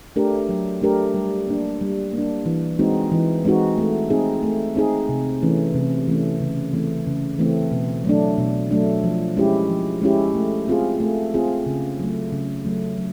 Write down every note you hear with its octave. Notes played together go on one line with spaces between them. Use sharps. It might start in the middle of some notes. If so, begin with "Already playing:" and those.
A3 D4 G4 A#4
F#3
A3 D4 G4 A#4
G3
A#3 D4
G3
A#3 D4
E3
G#3 C4 D#4 F#4
E3
G#3 C4 D#4 F#4
A3
C4 D#4 G#4
A3
C4 D#4 G#4
C3
E3 A3 C#4
C3
E3 A3 C#4
C#3
E3 A3 C4
C#3
E3 A3 C4
B2
F#3 A3 D4
B2
F#3 A3 D4
F3
G#3 C#4 E4 G4
F3
G#3 C#4 E4 G4
A3
C4 F4 G#4
A3
C4 F4 G#4
C#3
F#3 A3
C#3
F#3 A3
F#3